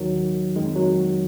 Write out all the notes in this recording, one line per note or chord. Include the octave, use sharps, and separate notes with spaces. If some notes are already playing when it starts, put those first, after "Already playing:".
Already playing: D#2 D#3 F#3
F2 D#3 G#3
F#3